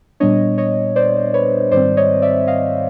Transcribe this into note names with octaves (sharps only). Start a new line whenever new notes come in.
A#2 G3 B3 D4 C#5 D#5
C#5 D#5
C5 D5
B4 C#5
G#2 D#3 G3 C4 C5 D5
C#5 D#5
D5 E5
D#5 F5